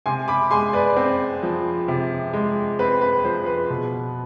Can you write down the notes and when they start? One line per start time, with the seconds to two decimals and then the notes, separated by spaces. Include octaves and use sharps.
0.06 C3 G#5 C6
0.28 B5 D6
0.51 G#3 G#5 C6
0.73 B4 D5
0.96 C4
1.43 F3
1.88 C3
2.33 G#3
2.79 C4 B4
3.01 B4
3.24 F3 C5
3.46 B4
3.70 B2